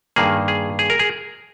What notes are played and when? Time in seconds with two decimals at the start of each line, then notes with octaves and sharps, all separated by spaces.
0.16 G2 D#3 A#3 G#4
0.48 G#4
0.79 G#4
0.90 A#4
0.99 G#4